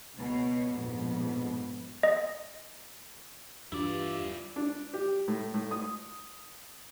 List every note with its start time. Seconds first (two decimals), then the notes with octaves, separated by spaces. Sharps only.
0.17 C#2 B2 C#5
0.71 A#1 F2 G#2 B2
2.03 D#5
3.72 E2 G2 E4 F4 D5
4.56 D4
4.94 G4
5.28 A2
5.54 A2
5.71 D#6